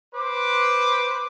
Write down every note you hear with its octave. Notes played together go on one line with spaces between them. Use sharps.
B4 C5 D6